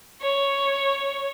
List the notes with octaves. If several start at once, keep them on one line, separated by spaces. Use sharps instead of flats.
C#5